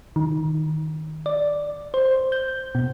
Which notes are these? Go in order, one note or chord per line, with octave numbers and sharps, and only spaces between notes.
D#3
D5
C5
G6
B2